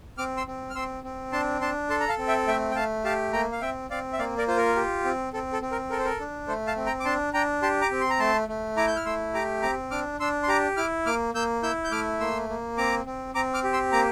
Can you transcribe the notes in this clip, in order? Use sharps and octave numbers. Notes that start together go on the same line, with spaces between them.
C4 D6 F6
C6 E6
C4
F6
C4 C6 E6
C4
D4 A5 C6
D4 A5 C6
A4 A5 C6
A#5
F5 A5
C4
E5 G5
A3 E5 G5
G5
A3 F5 A5
G4 F5 A5
A#3 G5 A#5
F5
C4 E5 G5
C4 D5 F5
E5
A#3 D5 F5
A#4 D5
F4 C5
A#4
G4
C4
C4 A4
A4
C4
A#4
A4 A#4
C5
A#4
D4
A3 A4 C5
F5 A5
C4
G5 A#5
D6
D4 A5 C6
D4 G5 A#5
G4 A5 C6
A#5 D6
C4
C6
A#5
A3 A5 C6
A3
E4 A#5 D6
G6
F6
A3 C6 E6
G4 A#5 D6
C4 A#5 D6
D4 D6 F6
D4 C6 E6
C6
G4 A#5 D6
E4 D6 F6
A#3 D6 F6
A#3 E6 G6
E4 E6 G6
G6
A3 D6 F6
A#3 C6 E6
A#3
C4 A#5 D6
C4
C4 A#5 D6
D6 F6
G4
C6 E6
A#3 A#5 D6